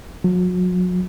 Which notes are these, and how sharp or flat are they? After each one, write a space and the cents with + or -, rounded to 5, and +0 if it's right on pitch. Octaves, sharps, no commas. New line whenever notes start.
F#3 -35